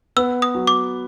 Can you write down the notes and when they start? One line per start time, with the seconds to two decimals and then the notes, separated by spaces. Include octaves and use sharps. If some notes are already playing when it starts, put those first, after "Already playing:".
0.16 B3 E6
0.42 D#6
0.55 F#3
0.67 D6